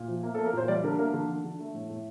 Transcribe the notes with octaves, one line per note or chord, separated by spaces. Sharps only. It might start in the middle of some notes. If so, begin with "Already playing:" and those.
Already playing: A#2
F3
A#3
A#3 A4
A#4
A#2 C5
G3 D5
D3 A#4
A#3 A#4
D3
D3
D3
A3
A2
A2